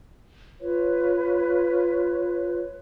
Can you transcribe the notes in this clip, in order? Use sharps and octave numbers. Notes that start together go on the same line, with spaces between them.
F4 B4 C#5